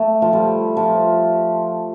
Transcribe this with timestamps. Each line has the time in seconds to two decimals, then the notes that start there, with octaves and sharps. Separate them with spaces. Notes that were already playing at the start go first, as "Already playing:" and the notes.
Already playing: A3
0.22 F3
0.33 G3
0.77 F3